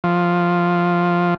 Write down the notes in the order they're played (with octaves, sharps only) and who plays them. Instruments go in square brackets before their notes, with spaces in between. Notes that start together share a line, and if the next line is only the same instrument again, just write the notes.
[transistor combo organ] F3